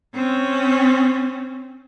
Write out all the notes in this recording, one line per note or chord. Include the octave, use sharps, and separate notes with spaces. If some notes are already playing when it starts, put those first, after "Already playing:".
C4 C#4